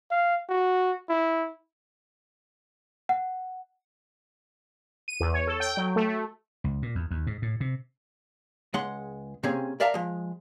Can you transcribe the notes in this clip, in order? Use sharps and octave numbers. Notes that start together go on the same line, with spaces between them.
F5
F#4
E4
F#5
D#7
E2
C#5
A4
G5
F#3
A3
A3
C#2
A#2
E2
D#2
G#2
A2
C3
C#2 G#3 F#5 C6
C3 A#3 C4 C#4 G#4
A#4 D5 E5 F5 A5 A#5
F3 G#3